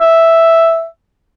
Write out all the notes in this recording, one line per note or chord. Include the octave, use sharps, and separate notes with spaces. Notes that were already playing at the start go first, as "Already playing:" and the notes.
E5